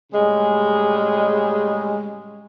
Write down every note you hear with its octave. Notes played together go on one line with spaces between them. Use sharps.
A2 C#3 G3 G#3